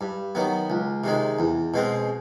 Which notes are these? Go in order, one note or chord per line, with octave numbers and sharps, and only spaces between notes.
G2
D#3 F#3 B3
C#2
C3 D#3 G#3
E2
B2 G#3 C4